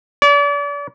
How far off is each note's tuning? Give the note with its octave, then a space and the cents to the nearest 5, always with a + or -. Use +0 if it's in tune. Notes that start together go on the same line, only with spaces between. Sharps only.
D5 -40